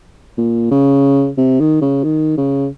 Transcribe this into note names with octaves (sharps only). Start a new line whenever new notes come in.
A#2
C#3
C3
D#3
C#3
D#3
C#3